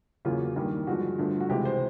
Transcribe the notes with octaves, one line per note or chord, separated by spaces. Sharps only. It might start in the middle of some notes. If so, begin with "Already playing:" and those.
E2 C#3 F#3 A#3 F4
G2 D#3 G3 A#3
G2 D3 F3 G#3 F#4
G2 D3 F3 A3
F#4
C#2 C3 E3 G#3 G4
C5